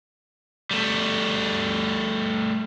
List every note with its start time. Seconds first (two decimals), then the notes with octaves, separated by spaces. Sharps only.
0.71 G3 A3